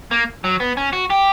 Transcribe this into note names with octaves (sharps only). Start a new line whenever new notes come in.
A#3
F#3
B3
C#4
F#4
G4